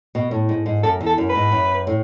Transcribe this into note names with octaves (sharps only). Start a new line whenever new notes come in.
B2
A2
G#2
G#2
F#2 A4
E2
A4
F#2
B4
G#2
F#2
A2